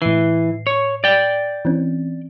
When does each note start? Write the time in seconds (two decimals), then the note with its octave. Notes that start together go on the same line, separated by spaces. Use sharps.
0.02 A2 E3 C7
0.67 C#5
1.04 D5 G5
1.65 E3 C4 C#4